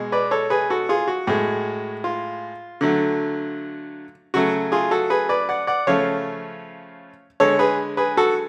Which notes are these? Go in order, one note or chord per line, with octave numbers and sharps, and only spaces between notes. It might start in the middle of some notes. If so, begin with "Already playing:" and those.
Already playing: B2 G#3
B4 D5
A4 C#5
G#4 B4
F#4 A4
F4 G#4
F#4
A2 G#3
F4
D3 F#3 A3
C#3 F#3 A3 F#4
F4 G#4
F#4 A4
G#4 B4
B4 D5
D5 F#5
D5 F#5
C#3 F3 A3 C#5 F5
D3 G#3 A4 C#5
G#4 B4
G#4 B4
F#4 A4